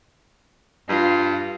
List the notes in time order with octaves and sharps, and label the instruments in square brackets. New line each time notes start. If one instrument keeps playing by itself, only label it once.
[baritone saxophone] G2 [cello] F4